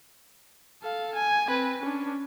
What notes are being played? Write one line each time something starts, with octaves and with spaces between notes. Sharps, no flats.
A4 F5
G#5
C4 B4
C#4 D4